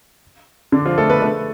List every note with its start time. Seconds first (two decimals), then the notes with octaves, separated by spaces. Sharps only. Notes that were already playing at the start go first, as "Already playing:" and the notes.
0.72 D3 D4
0.85 F3 F4
0.98 A3 A4
1.09 B3 B4
1.22 A3 A4